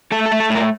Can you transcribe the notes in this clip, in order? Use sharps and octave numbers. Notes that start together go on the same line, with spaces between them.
A3 A4
A4
A3
A4
A2 A#4